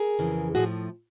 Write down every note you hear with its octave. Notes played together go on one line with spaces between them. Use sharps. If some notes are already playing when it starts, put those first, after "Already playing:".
Already playing: G#4 A#4
F2 C#3 E3
A2 F3 F#4 G#4